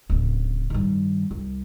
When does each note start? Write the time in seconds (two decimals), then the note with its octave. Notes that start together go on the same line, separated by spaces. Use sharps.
0.10 D1 C#3
0.70 G2 D#3
1.31 C2